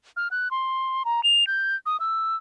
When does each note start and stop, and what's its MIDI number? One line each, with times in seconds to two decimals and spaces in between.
0.17 0.28 89
0.31 0.51 90
0.51 1.03 84
1.05 1.23 82
1.24 1.47 101
1.47 1.76 91
1.86 1.97 87
2.00 2.36 88